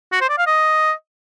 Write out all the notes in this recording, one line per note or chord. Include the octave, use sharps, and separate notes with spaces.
F#4
C5
D5
F5
D#5